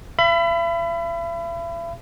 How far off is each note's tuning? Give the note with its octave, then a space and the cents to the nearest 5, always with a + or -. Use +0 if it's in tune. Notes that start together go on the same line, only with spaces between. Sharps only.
E5 +45 B5 +25